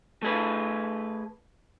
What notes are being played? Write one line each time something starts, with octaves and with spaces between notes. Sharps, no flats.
A3 G#4 B4